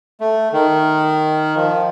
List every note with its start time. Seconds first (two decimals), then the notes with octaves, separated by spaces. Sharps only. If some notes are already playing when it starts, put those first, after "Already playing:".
0.21 A3
0.53 D#3
1.56 F3